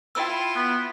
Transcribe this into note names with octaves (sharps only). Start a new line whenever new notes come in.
E4 F4 G5 B5 E6
B3